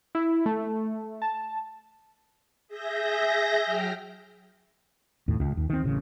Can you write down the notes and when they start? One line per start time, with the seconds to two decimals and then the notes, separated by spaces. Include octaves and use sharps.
0.15 E4
0.46 A3
1.22 A5
2.68 G#4 E5 G6 A#6
3.62 F#3 G5 F6
5.28 D#2 A2
5.40 C#2
5.57 D#2
5.70 D#3 C4
5.84 A1 C#3